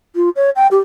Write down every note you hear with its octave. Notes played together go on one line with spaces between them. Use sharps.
F4
C#5
G5
G4